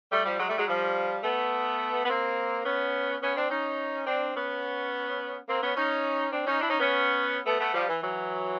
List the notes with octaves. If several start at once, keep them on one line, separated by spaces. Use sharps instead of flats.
G3 A3
F3 G3
F#3 G#3
G3 A3
F#3 G#3
F3 G3
A3 B3
B3
A#3 C4
B3 C#4
B3 C#4
C4 D4
C#4 D#4
C4 D4
B3 C#4
A#3 C4
B3 C#4
C#4 D#4
C4 D4
C#4 D#4
D4 E4
C#4 D#4
B3 C#4
A3 B3
A3 B3
F3 G3
E3
E3 F#3